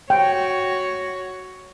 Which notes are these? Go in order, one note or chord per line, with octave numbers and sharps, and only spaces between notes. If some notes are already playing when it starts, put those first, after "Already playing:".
F#4 C#5 G5